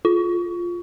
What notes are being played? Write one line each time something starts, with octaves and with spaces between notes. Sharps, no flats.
F4